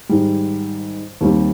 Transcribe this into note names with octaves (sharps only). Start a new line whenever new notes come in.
G#2 D#3 G3
D#2 D#3 G3 C4